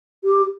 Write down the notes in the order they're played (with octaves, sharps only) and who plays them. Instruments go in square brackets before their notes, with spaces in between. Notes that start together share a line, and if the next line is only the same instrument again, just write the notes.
[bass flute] G4